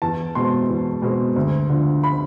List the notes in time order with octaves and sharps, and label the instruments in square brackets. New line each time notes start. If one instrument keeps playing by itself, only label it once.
[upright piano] E2 A5
B2 G#3 C4 C6
E2
B2 G#3 C4
D2
D3 F3
B5